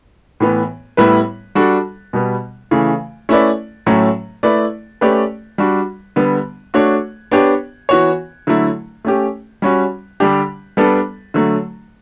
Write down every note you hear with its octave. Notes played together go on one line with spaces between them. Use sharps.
A2 E3 B3
A2 G3 B3 E4 B4
G3 D4 F#4 A4
B2 G3 B3
C#3 E3 A3
A3 C#4 E4 B4 D5
A2 F#3 A3 C#4
A3 E4 B4 D5
A3 C#4 G4 B4 D5
G3 D4 F#4
D3 G3 B3
A3 D4 F#4 C#5
B3 D4 G4 C#5
E3 B3 F#4 C#5
D3 F#3 A3 E4
A3 C#4 G4
G3 C#4 F#4
D3 G3 D4 G4
G3 B3 D4 A4
D3 F#3 A3